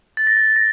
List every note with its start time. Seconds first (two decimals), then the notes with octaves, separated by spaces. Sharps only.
0.17 A6
0.27 A#6
0.37 A6
0.56 A#6